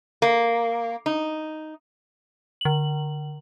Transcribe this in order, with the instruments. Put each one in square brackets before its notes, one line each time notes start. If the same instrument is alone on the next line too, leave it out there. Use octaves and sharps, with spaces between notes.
[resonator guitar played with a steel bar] A#3
D#4
[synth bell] D3 F#7